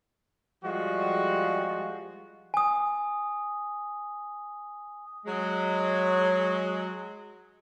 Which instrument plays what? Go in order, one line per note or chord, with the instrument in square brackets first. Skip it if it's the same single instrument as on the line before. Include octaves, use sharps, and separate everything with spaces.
[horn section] F3 G3 G#3 F#4
[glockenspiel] G#5 D#6
[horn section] F#3 G#3